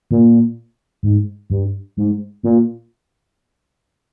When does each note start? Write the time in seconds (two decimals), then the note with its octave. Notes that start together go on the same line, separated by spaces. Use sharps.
0.11 A#2
1.03 G#2
1.50 G2
1.97 G#2
2.43 A#2